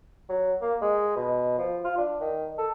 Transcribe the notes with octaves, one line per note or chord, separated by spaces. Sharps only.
F#3
A#3
G#3
B2
F3
F4
D4
D#3
A4